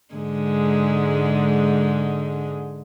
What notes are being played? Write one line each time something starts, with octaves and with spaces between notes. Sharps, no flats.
G#2 D3 G#3